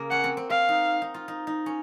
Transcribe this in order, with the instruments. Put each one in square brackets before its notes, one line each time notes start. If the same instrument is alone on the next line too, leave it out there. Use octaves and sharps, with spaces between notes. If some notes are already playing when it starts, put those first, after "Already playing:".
Already playing: [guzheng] C#3 A#3
[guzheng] C#4 [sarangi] F#5
[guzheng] C4
C4
[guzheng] C4 [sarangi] F5
[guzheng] D#4
D#4
F4
D#4
D#4
C#4